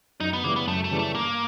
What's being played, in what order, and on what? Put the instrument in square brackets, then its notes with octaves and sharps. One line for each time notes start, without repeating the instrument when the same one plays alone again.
[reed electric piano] F#2 [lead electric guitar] D#4
[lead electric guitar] B3
[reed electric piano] C#3 E3 G3 [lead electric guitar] A#3
[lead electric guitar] B3
[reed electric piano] F#2 [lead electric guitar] A3
[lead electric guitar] A3
[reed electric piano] C#3 E3 G3
[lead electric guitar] A3
[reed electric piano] G2 [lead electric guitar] A#3